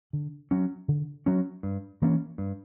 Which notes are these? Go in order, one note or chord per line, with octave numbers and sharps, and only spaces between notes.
D3
F#3 C#4
D3
F#3 C#4
G2
E3 A#3 C#4
G2